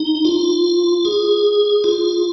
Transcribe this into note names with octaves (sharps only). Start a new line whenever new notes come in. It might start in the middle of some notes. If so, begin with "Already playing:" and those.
Already playing: D#4
F4
G#4
F4